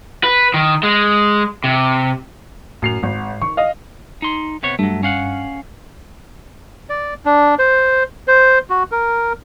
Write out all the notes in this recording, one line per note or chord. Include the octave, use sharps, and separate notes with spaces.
B4
D#3
G#3
C3
F#2 A2 C7 F7
G#1 G#2
D#3 C#6
D#5 F5
D#4 C6
C3 B3 C#5
G2 F#3 A3
C#4 F5 F#5
D5
D4
C5
C5
F#4
A#4